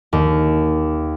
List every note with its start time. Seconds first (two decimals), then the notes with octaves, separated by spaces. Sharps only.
0.13 D#2